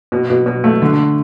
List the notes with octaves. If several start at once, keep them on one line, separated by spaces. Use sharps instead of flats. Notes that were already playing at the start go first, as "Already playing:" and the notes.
B2
B2
B2
A3
D3